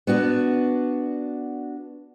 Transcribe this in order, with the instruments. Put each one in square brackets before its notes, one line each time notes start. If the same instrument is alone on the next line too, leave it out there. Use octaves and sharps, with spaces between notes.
[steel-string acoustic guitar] B3 D4 F#4